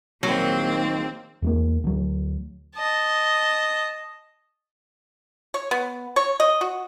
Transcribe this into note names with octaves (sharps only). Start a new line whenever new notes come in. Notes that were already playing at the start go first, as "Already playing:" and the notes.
A#1 D#3 F#3 A#3 C4
E2 G#3 A#3
D2 F#3
D#5 A5
C#5
B3
C#5
D#5
F#4